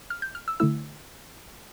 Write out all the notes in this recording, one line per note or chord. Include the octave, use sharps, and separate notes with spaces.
F6
G6
F6
E6
D3 A3 E4 E6